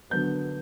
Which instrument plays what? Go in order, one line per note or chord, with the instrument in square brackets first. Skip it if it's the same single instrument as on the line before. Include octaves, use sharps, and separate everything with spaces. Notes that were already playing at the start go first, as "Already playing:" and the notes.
[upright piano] D3 F#3 B3 G6